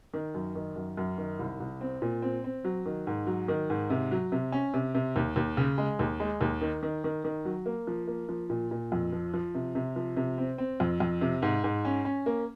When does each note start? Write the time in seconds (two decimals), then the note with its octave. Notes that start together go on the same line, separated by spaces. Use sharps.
0.14 D#3
0.35 F#2
0.56 D#3
0.76 F#2
0.97 F#2
1.18 D#3
1.39 C2
1.60 C2
1.81 C4
2.02 A#2
2.22 C4
2.44 C4
2.64 F#3
2.86 D#3
3.07 G#2
3.27 F#3
3.48 D#3
3.70 G#2
3.90 C3
4.12 F#3
4.32 C3
4.52 C#4
4.74 C3
4.95 C3
5.16 D#2
5.36 D#2
5.57 C#3
5.78 G#3
5.99 D#2
6.20 G#3
6.41 D#2
6.61 D#3
6.83 D#3
7.04 D#3
7.24 D#3
7.45 F#3
7.66 A#3
7.87 F3
8.08 A#3
8.29 F3
8.50 A#2
8.71 A#2
8.92 F2
9.12 F3
9.34 F3
9.55 C3
9.75 C3
9.96 F3
10.17 C3
10.38 C4
10.58 C4
10.80 F2
11.00 F2
11.21 C3
11.42 G#2
11.64 G#2
11.85 C#4
12.05 C#4
12.26 A#3